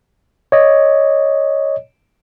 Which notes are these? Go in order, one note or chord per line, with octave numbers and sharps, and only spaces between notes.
C#5 D#5